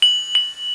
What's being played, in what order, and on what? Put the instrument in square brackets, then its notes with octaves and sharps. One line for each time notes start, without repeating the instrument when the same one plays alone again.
[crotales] F#7
F#7